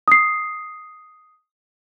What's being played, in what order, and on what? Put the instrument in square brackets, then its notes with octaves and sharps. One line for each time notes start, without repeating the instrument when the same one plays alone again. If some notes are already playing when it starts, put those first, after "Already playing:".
[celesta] D#6 C7